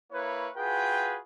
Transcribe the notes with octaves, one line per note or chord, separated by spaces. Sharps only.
A#3 E4 B4 C#5
F4 F#4 G#4 B4 G5